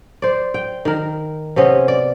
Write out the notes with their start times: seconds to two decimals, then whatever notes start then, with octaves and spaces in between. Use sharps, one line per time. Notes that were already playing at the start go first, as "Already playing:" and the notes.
0.22 C5 D5
0.54 G5
0.85 D#3 A#4
1.56 C3 B3 C#4 D#5
1.88 D5